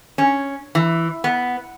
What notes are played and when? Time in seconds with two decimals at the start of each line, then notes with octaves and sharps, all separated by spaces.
0.18 C#4
0.75 E3
1.24 B3